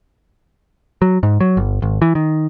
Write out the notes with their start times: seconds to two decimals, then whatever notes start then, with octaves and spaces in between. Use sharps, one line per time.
1.02 F#3
1.23 G#2
1.40 F#3
1.57 G1
1.82 G#1
2.02 E3
2.15 D#3